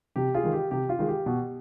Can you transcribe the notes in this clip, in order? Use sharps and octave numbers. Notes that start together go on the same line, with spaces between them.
C3 G4
F4 G#4
D#3 G#3
G4
C3 G4
F4
D#3 G#3
G4
B2